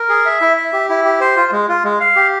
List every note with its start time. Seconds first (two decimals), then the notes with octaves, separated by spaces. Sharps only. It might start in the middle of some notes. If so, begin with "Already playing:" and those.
Already playing: A#4
0.09 G#4
0.26 E5
0.41 E4
0.57 E5
0.73 G4
0.89 E4
1.05 G4
1.20 C5
1.36 F4
1.52 G#3
1.69 F4
1.84 G#3
2.00 F5
2.16 G4